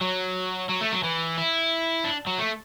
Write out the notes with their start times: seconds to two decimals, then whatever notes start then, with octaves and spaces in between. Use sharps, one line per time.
0.01 F#3
0.69 F#3
0.81 A3
0.92 F#3
1.03 E3
1.38 E4
2.05 D4
2.27 F#3
2.39 A3